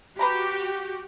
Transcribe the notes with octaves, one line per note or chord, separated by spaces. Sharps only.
F#4 G4 B4 A#5 B5